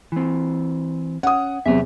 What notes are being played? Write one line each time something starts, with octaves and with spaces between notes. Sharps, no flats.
E3 C4
C#4 F#5 D#6
E2 C3 F#3 E5